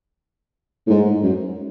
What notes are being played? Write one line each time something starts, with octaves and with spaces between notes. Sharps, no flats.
A2
G#2
F#2